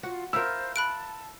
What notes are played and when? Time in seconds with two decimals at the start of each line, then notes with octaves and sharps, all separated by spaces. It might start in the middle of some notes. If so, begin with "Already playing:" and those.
0.03 F4 F#4
0.33 E4 F4 A#4 C5 E6
0.76 A5 B5 F#6 D7